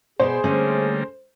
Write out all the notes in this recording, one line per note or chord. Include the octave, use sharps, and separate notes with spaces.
B2 B3 G#4 C5 D5
D3 G3 A3 A#3 C#4